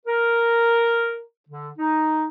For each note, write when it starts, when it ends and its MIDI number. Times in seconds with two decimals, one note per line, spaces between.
0.06 1.22 70
1.49 1.68 50
1.77 2.26 63